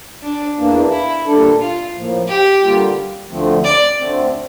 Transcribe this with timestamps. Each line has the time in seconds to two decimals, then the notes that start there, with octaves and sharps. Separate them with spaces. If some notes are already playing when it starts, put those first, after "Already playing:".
0.23 D4
0.57 E2 E3 A#3 D4
0.91 E4
1.26 A#2 G3 D4 A4
1.60 F4
1.93 A2 F3 A#3
2.28 G4
2.62 D3 G3 A#3 F4
3.30 D2 D3 F3 A3 C4
3.64 D5
3.99 D2 D3 A3 C4